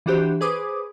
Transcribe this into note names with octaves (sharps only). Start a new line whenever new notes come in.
E3 D4 F#4 G4 C5
G#4 B4 C5 D6 D#6